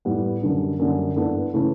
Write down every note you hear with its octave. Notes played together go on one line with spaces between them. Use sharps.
A2 E3 G3 B3
F#2 D3 G3 D4
F#2 D3 G3
G2 E3 B3 D4 A4
C#3 E3 A3